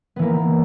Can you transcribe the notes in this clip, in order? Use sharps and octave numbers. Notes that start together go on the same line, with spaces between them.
E3 A#3 B3